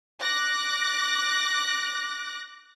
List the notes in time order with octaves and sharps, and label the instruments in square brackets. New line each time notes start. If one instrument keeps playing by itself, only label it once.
[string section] D6 F#6 A#6